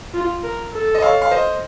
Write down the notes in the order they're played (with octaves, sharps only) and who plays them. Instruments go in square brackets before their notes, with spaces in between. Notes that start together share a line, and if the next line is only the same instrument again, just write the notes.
[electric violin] F4
A#4
A4
[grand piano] D#5
C#5 F5
F5
C5 D#5